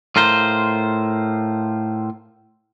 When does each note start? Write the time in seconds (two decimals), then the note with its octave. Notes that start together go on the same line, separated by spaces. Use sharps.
0.16 A2 F4 A#4 C5